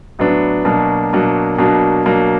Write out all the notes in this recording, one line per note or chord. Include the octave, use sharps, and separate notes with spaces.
A2 F#3 B3 D4
B2 F#3 A#3 D4
B2 F#3 A#3 D4
B2 F#3 A#3 D4
B2 F#3 A#3 D4